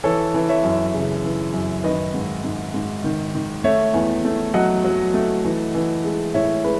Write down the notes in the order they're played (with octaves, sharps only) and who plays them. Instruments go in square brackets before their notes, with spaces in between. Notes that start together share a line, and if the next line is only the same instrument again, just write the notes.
[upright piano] E3 A4 C#5
E3
C#5 E5
F#2
C#3
E3
F#2
D#3 B4 D#5
G#2
G#2
G#2
D#3
D#3
A3 C#5 E5
E2
A3
F#3 D#5 F#5
F#3
A3
E3
E3
G#3
A2 C#5 E5
G#3 B4